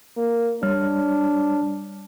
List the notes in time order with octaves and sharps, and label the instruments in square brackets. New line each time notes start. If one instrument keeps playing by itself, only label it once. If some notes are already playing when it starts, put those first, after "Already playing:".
[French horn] A#3
[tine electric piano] G3 C#5 F6 [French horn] D4